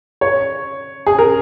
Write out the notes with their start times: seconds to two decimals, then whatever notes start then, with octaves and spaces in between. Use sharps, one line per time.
0.21 C#5
1.07 G#4
1.19 A#4